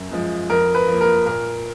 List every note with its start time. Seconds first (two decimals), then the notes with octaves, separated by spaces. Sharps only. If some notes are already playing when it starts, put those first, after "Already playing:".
Already playing: F#2
0.11 F3 G#3
0.50 F2 A#4
0.75 B4
0.88 F3 A#3
1.01 A#4
1.26 A#2 A#4